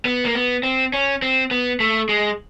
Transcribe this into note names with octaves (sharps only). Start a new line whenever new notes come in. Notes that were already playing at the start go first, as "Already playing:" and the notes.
B3
A#3
B3
C4
C#4
C4
B3
A3
G#3